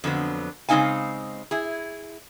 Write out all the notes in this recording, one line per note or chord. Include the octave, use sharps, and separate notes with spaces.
F2 D3 F#3 B3
C#3 G#3 C4 D#4 F5 G#5
E4 G#4